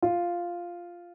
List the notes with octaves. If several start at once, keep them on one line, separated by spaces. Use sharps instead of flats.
F4